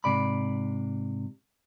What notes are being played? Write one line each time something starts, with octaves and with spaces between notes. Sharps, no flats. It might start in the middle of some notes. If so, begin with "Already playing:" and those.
G#2 C3 D5 B5